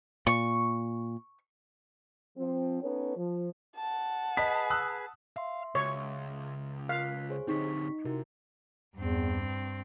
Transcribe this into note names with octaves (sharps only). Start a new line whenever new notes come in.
A#2 C#6
F3 C4
B3 C#4 D#4 A4 B4 C#5
F3
F#5 A5
G#4 B4 D#5 B6
D#6 E6 F#6
E5 F5 C6
C#2 C#5
F4 F5 F#6 B6
G#4 C5 C#5
D3 C4 D#4 G4 C#6 B6
C3 E4 F#4 A#4
E2 G2 C4